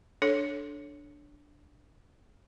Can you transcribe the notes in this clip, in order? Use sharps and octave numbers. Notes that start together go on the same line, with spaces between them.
D4 A4 C#5